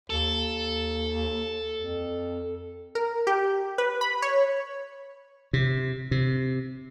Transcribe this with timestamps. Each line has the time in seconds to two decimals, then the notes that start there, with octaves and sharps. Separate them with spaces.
0.10 D#2 A4
1.77 F2
2.95 A#4
3.27 G4
3.78 B4
4.01 B5
4.22 C#5
5.53 C3
6.11 C3